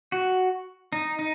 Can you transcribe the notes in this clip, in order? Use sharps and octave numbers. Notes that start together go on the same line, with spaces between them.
F#4
D#4
D#4